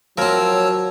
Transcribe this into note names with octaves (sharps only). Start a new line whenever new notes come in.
F3 F#3 C4 A#4 C#5 E6